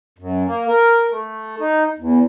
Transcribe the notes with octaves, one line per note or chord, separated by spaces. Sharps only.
F#2
A#3
A#4
A3
D#4
E2